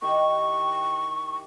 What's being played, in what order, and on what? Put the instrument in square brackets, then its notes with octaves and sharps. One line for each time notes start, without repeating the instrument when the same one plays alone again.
[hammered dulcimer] D#3 E4 G4 [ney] C#6